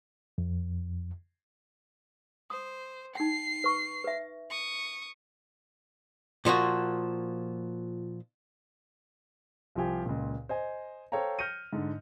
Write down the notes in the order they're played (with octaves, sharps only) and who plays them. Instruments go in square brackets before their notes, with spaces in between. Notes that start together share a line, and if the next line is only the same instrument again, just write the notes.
[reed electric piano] F2
[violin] C5 [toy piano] D#6
[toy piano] D#4 G5 [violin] C7
[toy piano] B4 C#6
B4 E5
[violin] C#6 D#6
[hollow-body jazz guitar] A#2 F3 A#3 F#4
[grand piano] C2 F3 F4 G4 G#5
C#2 A#2
C5 D#5 G#5
A4 C5 C#5 F5 G5 A#5
F6 G6 A#6 C#7 D#7
G#2 D3